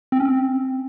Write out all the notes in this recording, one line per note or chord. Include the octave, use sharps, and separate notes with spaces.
C4
C#4
C4